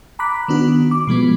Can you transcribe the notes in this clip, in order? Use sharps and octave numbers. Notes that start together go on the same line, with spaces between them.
A#5 B5 D6 F#6 B6
D#3 B3 D4 F#4
D6
B2 F3 G#3 B3